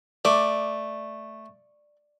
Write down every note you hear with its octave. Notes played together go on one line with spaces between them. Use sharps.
A3 D5